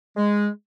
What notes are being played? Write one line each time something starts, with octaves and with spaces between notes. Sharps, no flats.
G#3